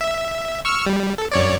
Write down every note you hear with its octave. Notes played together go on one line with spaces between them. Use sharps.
E5
C#6 E6 F6
G3
A4
F#2 C#5 D5